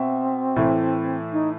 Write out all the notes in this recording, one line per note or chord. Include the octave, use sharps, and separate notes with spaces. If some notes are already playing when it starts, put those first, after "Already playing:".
Already playing: B2 C4 E5
A2 E3 A3
D#4